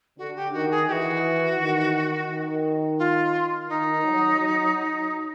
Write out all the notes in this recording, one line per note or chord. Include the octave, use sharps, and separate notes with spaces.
D3 F#4
G4
D#3 F#4
G#4
E3 F#4 G4
D#3
D#3
F4
D#3 D#4
F#3
F#3